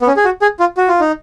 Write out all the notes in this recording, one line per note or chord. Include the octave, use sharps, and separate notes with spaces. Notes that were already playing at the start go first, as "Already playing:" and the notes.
B3
C#4
G#4
F#4
G#4
F4
F#4
F4
D#4